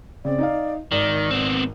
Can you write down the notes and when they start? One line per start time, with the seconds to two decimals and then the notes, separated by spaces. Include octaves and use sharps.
0.25 C#3 C4 D5
0.39 D#4 D#5 F5
0.92 G#1 D#3 D5
1.31 B3 C4